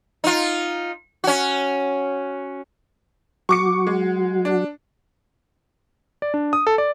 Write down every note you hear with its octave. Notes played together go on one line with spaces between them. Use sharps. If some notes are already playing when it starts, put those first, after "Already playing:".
D#4 F4
C#4 F#4
F#3 F#4 C#6 D6 C#7
G#3
D4
D5
D4
D#6
A4
D5